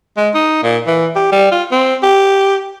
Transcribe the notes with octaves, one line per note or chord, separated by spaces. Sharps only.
G#3
D#4
A#2
E3
G4
G3
F4
C4
G4